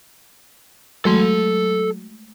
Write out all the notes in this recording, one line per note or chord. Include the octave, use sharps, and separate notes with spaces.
F#3 G#3 A3 A4 C6